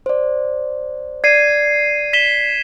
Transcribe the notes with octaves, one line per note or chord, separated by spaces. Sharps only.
C5 D5
D5 G#6 C7 D#7
B6 E7 G7